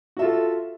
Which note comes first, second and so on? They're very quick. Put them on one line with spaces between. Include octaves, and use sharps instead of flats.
F#4 E5 F4 A4